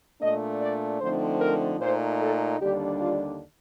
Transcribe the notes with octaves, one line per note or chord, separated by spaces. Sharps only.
A#2 A3 D4 D#5
D5
D3 F3 A3 C4 D#4 C5
A#4
A#2 A3 D#4 C5
A4
D#2 D3 G3 D4 G4
F4